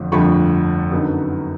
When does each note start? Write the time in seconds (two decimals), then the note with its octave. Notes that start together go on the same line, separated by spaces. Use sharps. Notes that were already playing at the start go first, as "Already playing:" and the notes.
Already playing: G1 F2 D3 F3 A3
0.12 G1 F2 D3 F3 A3 B5 C#6
0.92 F#2 D3 F#3 B3 D#4